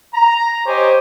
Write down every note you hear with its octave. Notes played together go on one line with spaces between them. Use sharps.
A#5
G4 C5 C#5 D#5 G#5